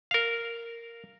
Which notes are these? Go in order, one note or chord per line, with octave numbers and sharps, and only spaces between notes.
A#4 F5